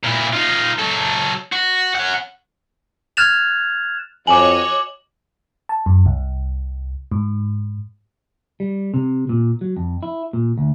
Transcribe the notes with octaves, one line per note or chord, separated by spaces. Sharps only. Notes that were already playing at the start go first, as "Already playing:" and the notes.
A#2 E4
D#4 F4
F#3 A4
F#4
C#4 F#5
F6 F#6 G#6 A6 E7 F7
F2 F#4 C#5 D#5 G#5 D6 F#7
A5
F#2
C2
G#2
G3
C3
A#2
F#3
F2
E4
A#2
D2